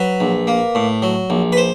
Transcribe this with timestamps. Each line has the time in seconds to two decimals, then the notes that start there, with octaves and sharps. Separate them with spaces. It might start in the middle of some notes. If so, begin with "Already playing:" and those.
Already playing: F#3 B4
0.20 A#1
0.47 A#3
0.75 A2
1.02 F#3
1.30 A#1
1.52 B4
1.57 C5